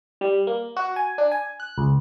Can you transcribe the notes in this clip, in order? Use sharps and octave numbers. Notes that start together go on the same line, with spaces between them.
G3
A#3
F#4
G#5
D4
G#5
F#6
C#2